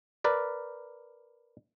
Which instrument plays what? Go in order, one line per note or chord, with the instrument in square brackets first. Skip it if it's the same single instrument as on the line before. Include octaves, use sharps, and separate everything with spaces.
[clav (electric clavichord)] A#4 B4 D5